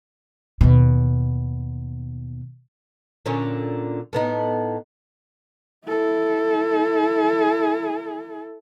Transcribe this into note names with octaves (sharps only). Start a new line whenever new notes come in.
D#2 B2
A#2 D3 C#4
A2 B3 D#4
E4 A4